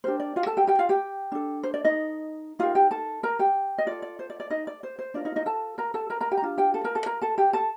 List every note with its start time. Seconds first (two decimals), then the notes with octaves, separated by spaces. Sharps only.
0.04 D4 G4 A#4 C5
0.20 D5
0.36 F4 F5
0.46 A4 A5
0.57 G4 G5
0.67 G4 G5
0.79 F4 F5
0.89 G4 G5
1.32 D4 A4
1.63 C5
1.74 D5
1.85 D#4 D#5
2.59 D#4 F4 G4 A#4 F5
2.75 G4 G5
2.91 A4 A5
3.23 A#4 A#5
3.39 G4 G5
3.78 D#5
3.86 F4 A4 D5
4.02 D5
4.19 C5
4.30 D5
4.40 D5
4.50 D#4 D#5
4.67 D5
4.83 C5
4.99 C5
5.14 D4 F4 A#4 D5
5.25 D#4 D#5
5.36 D#4 D#5
5.46 A4 A5
5.78 A#4 A#5
5.94 A4 A5
6.10 A#4 A#5
6.21 A#4 A#5
6.31 G4 G5
6.38 A#5
6.42 D4 F4
6.58 G4 G5
6.74 A4 A5
6.84 A#4 A#5
6.95 A4 A5
7.06 A#4 A#5
7.22 A4 A5
7.38 G4 G5
7.53 A4 A5